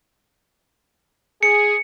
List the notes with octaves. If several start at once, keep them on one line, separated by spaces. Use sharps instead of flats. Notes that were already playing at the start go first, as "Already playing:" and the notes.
G#4 C#7